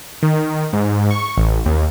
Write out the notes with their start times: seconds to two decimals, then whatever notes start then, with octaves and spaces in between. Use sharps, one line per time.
0.23 D#3
0.73 G#2
1.11 C#6
1.37 A1
1.65 D#2